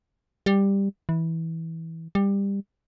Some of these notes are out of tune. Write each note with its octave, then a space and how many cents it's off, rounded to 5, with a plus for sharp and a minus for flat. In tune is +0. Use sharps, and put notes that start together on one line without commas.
G3 +10
E3 -15
G3 +20